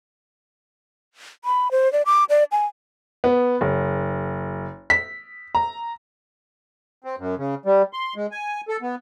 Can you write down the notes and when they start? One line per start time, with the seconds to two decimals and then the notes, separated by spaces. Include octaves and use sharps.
1.45 B5
1.71 C5
1.93 D5
2.06 D6
2.30 D5
2.52 G#5
3.24 B3
3.61 F#1
4.90 B6
5.55 A#5
7.04 C4
7.18 F#2
7.38 C#3
7.66 G3
7.93 C6
8.16 G#3
8.32 G#5
8.68 A4
8.82 B3